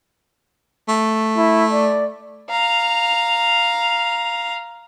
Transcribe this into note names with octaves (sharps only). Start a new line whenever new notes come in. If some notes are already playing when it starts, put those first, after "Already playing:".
A3
E4
D5
F5 A#5